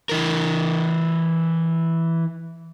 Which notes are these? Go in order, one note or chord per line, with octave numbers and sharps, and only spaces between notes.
E3 A#4